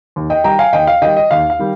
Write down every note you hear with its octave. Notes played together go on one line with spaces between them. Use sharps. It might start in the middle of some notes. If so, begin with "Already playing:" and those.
D#2
D#5 G5
D#3 G3 G5 A#5
F5 G#5
D#2 D#5 G5
F5
D#3 G3 D#5 G5
D#5
D#2 F5
F5
D#3 G3